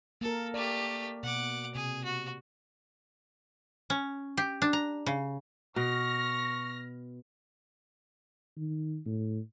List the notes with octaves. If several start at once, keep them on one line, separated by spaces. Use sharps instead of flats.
A#3 A4 A#4
A3 G4 D5
B2 F#5 D6
C3 G#4
F#4
C#4
G4
D4
A#5
C#3
B2 C#6 F6 A#6
D#3
A2